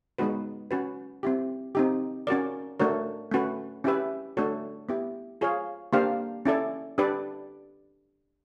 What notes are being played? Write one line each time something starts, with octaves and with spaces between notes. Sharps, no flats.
G#3 B3 D#4 F#4 B4
C#4 F#4 B4
C4 E4 G4
C4 D#4 G4
C#4 F#4 A#4 D5
A3 D4 F#4 A#4 C#5
A3 C#4 F#4 B4
C#4 E4 G4 B4 E5
A3 D4 F#4 A4 C#5
B3 E4 G4
F4 G#4 C#5 F5
A#3 D4 G4 C5 F5
C#4 E4 A4 D5
D4 G4 B4 D5